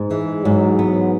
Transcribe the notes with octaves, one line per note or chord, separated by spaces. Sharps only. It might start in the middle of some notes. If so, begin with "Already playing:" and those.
Already playing: G#2
E3 G#3
G#2 F#3
B3